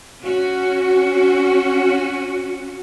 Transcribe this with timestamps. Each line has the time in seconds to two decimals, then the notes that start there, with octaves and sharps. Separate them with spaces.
0.22 C#4 F#4